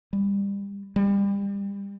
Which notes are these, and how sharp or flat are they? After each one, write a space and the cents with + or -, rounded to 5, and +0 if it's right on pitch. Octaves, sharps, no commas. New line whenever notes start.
G3 +30
G3 +30